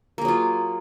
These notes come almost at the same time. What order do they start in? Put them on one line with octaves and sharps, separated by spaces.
A#3 G#4 F#3 F4